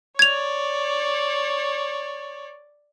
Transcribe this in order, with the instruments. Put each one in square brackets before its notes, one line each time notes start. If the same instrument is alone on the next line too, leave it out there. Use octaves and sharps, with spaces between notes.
[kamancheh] C#5 D5 [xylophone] G#6 F7